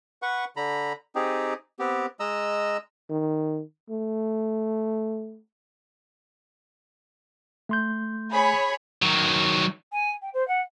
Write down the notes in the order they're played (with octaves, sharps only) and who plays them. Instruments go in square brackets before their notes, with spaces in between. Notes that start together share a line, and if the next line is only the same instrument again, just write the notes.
[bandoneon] B4 F#5 C#6
D3 A#5 B5
C4 D#4 G4 G#4
B3 C4 G4
G#3 D#5 A#5 E6
[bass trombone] D#3
A3
[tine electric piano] A3 C6 G6
[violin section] G#4 C#5 B5
[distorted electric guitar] D#3 F#3
[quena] G#5
G5
C5
F#5